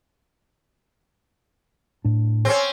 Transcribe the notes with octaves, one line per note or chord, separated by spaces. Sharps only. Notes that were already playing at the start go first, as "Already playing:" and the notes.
A2 D4
C4 C#4